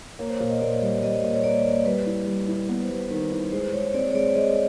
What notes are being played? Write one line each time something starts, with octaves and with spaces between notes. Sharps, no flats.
A#3 C#5
C5
C#5
A#2
D#5
A#2 D5
G3
G3 D#5
A#2
C#5
A#3 D5
A#3
G3 B4
E4
G3
E4
B3 B4
C5
G3
B4
D#3 B4
E4
G#3 C5
G#3 C#5
C4 D5
C#5
G#3 D5
G#3 D#5